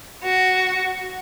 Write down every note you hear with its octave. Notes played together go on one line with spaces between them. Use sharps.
F#4